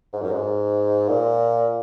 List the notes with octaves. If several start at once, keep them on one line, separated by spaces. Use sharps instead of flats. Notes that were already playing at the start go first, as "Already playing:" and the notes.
G#2
F#2
G#2
A#2